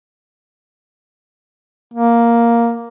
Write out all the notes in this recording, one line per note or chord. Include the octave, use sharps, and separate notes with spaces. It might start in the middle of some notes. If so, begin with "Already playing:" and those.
A#3